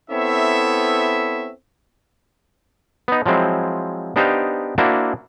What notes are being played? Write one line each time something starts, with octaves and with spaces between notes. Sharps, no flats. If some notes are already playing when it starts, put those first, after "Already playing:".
B3 C4 E4 A4 C#5 E5
B3 D#4
F3 F#3 G#3 C4 E4
B3 D4 D#4 G4 C5 F5
A#3 D4 E4 F#4 C5 E5